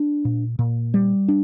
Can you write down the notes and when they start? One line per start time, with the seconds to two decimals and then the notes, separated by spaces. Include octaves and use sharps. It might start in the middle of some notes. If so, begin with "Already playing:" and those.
Already playing: D4
0.25 A#2
0.59 A#2
0.94 G3
1.28 D4